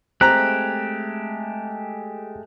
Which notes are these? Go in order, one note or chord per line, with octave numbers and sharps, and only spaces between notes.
G#3 A3 C4 G4 A#5 F#6